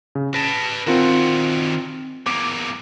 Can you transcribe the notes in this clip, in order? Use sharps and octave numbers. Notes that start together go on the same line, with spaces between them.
C#3
B4 A5 A#6
D#3 C4 F4 F#4 A#4
E2 A#3 D6